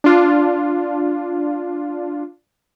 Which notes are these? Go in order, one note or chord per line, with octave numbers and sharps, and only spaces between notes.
D4 F4